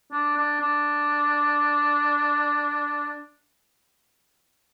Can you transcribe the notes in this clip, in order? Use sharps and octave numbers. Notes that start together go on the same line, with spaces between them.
D4
D4
D4